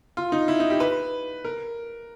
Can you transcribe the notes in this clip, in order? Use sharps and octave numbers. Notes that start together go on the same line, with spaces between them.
F4
D#4
E4
D#4
G4
B4
A#4